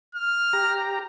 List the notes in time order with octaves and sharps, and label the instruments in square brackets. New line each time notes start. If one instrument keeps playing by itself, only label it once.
[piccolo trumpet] F6
[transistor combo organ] G4 A#5